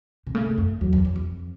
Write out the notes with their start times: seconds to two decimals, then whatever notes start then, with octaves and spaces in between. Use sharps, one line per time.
0.27 C3
0.35 C#3 A3
0.46 G#2
0.58 F#2
0.81 E2 F#3
0.93 E2
1.05 E2
1.16 F2